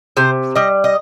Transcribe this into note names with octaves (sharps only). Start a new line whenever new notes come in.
C3 C5
G3 D#5
D#5